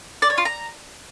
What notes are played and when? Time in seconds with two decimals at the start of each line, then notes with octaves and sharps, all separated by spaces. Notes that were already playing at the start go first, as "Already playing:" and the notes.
0.22 D5
0.30 C#5
0.38 F4
0.45 A#5